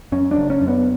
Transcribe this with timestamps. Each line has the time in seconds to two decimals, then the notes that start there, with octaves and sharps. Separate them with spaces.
0.12 F#2 C#4
0.31 D4
0.37 F#1
0.50 C#4
0.62 F#2
0.68 B3